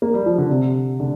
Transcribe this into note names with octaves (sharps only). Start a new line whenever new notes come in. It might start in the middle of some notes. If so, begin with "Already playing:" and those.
A#3
G3
F3
D3
C3
D3